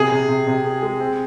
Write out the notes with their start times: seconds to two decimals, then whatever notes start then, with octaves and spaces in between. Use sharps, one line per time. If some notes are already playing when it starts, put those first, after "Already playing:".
Already playing: C3 G#4
0.12 C3
0.29 C3
0.47 C3
0.64 G#4
0.83 G#3
1.00 C4